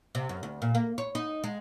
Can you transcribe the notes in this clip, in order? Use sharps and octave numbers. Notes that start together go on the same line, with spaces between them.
C3
F#2
D2
A#2
A#3
C#5
D#4
G#3